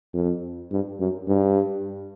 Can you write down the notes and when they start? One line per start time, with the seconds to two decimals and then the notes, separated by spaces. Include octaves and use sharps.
0.14 F2
0.72 G2
1.00 F#2
1.28 G2